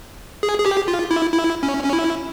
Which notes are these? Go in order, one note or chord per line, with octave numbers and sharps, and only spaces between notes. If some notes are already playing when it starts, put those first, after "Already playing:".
G#4
G#4
G4
F4
E4
E4
C#4
C#4
E4